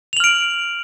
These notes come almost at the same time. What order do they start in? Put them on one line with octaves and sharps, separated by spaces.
F7 F#7 F6 D7